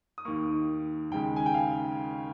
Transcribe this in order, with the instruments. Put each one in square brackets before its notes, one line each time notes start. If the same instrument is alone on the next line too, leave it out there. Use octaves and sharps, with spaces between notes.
[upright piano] D#6
D#2 D#3 A#3 C#6
D#2 C#3 G#3 G5
G#5
G5
F5